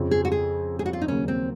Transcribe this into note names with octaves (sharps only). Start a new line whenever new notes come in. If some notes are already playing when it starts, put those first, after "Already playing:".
Already playing: F2 C#3 F3
G#4
F#4
G#4
G#4
F#4
F4
D#4
D#2 C#3 F#3 A#3 C#4
C4